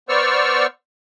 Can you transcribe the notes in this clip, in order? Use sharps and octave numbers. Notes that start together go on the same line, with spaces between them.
B3 C5 D5 C#6 E6 F6